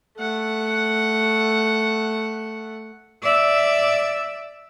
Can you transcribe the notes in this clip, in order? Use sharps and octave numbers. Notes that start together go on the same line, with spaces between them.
A3 F#5
D5 E5